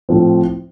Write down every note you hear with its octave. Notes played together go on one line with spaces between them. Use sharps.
A2 F3 C4